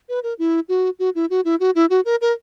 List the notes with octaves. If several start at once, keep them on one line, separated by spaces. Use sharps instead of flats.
B4
A#4
E4
F#4
F#4
E4
F#4
E4
F#4
E4
F#4
A#4
A#4